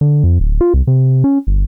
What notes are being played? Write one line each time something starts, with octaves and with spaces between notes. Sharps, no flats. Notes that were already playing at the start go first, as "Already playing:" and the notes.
D3
F2
D1
F4
C2
C3
C#4
G1